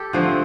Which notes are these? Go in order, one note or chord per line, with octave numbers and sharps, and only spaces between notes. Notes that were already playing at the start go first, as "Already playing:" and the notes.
Already playing: G4 A4
D3 F3 A3 C4